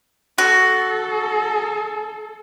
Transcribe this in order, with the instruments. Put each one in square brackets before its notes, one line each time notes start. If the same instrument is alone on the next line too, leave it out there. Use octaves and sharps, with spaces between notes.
[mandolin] F#4 [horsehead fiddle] A4